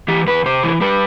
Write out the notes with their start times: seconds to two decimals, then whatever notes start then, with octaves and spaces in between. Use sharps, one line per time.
0.08 E3 G4
0.27 E2 B4
0.46 C3 C5
0.63 E3
0.81 G3 B4